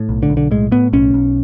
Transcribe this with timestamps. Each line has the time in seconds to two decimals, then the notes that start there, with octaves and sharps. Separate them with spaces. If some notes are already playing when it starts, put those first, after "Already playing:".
Already playing: A2
0.09 B1
0.23 D3
0.30 B1
0.37 D3
0.51 A2 G#3
0.72 A2 B3
0.93 B1 C#4
1.14 B1